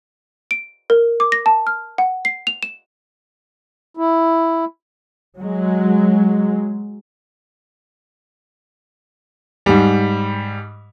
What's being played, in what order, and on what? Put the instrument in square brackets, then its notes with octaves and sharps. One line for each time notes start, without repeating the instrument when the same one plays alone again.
[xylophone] D7
A#4
D6
A#6
A5
F6
F#5
C7
F7
E7
[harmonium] E4
[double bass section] F#3 G#3
[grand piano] G#2 G3